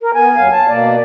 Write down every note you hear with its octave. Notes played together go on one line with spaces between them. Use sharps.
A#4
B3 G#5
D#2 F#3 F5
A5
B2 A#3 D5